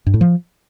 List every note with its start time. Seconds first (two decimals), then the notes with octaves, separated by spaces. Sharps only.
0.06 G2
0.14 A2
0.21 F3